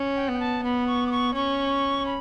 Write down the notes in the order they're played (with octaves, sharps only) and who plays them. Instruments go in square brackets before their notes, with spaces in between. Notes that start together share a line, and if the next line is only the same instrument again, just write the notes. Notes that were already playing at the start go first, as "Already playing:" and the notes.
Already playing: [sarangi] C#4
[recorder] G5
[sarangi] B3 [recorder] G5
[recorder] A5
[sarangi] B3 [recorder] B5
[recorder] C#6
D6
C#6
[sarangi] C#4 [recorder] C#6
[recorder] B5